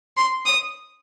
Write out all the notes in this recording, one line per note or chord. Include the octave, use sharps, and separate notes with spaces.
C6
D#6